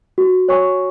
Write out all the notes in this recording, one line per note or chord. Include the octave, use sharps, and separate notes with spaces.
F#4
C#5 G#5 C#6